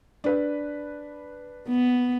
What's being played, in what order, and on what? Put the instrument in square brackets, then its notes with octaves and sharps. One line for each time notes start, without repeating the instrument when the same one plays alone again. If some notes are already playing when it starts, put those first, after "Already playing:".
[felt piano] D4 B4
[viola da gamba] B3